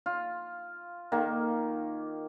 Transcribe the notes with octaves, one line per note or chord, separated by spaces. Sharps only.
F4
D#3 A#3